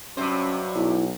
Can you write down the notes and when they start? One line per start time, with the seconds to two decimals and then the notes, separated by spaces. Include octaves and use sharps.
0.17 G2 C3 F#3 C#4 C5
0.75 B1 E4